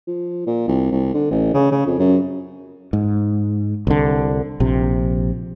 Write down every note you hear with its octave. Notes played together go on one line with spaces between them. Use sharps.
F3
A#2
C2
C2
D3
A1
C#3
C#3
F2
F#2
G#2
C2 D3
A#1 C3